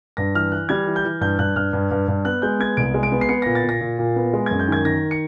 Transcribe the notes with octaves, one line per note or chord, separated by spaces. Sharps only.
G2 A#6
E3 F6
E3 F#6
G3 G#6
E3
G6
E3
G2 G6
G2 F#6
G2 F6
G2
G2
G2
B3 F#6
G#3 G6
B3 G#6
C2 D7
G#3
D7
B3
C7
B3 C#7
A#2 A#6
A6
A#2
A#6
A#2
A#2
B3
G#3
F#2 G#6
G6
D#3 G#6
D#3 A#6
C#7